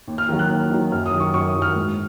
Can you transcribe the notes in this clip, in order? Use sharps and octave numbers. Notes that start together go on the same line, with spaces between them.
D#2
F6
D#3 F#3
F#6
D#2
D#3 F#3
F#2 F6
D#6
D#3 F#3
C#6
F#2 C#6
D#6
D#3 F#3
F6
G#2